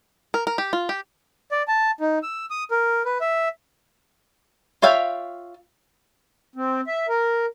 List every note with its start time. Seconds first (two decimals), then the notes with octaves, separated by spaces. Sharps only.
0.34 A#4
0.47 A#4
0.58 G4
0.73 F4
0.89 G4
1.52 D5
1.68 A5
2.00 D#4
2.23 E6
2.50 D#6
2.71 A#4
3.05 B4
3.21 E5
4.82 F4 C#5 E5 F5 G5
6.56 C4
6.87 E5
7.08 A#4